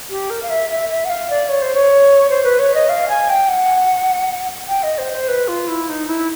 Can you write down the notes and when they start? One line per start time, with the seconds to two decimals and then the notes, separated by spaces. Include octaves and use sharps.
0.10 G4
0.30 A#4
0.43 F5
0.50 E5
0.70 E5
0.89 E5
1.05 F#5
1.10 F5
1.30 D5
1.49 C#5
1.62 C5
1.75 C#5
2.30 C5
2.44 B4
2.59 C#5
2.74 D#5
2.89 F5
3.09 G#5
3.29 G5
3.49 F#5
4.68 G5
4.83 D#5
4.98 C5
5.13 C5
5.28 B4
5.48 F4
5.67 E4
5.89 D#4
6.07 E4